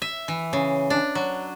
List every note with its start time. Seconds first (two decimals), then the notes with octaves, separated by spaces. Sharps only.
0.02 E5
0.28 E3
0.53 C#3
0.90 D4
1.15 F#3